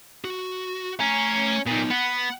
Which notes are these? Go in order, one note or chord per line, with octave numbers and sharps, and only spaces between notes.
F#4
A3 C#4 A#5
A#2 B3 D#4
B3 F#5